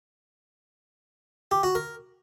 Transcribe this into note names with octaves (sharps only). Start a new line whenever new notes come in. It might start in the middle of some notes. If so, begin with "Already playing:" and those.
G4
F#4
A#4